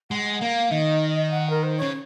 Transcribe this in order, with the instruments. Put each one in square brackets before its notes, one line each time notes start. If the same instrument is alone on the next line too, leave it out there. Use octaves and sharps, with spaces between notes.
[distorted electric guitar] G#3 [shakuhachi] F#5
[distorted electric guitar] A#3 [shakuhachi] F5
[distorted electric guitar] D#3 [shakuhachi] D#5
[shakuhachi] F#5
A#4
C5
[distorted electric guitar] C#3 [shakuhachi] C#5